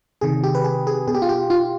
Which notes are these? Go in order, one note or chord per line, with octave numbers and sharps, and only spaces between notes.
C3 D#3 G#4
G4
B4
G#4
G#4
B2 G#4
G4
F4
G4
F4